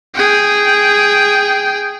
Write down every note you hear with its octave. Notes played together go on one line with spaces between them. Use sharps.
G#4 G5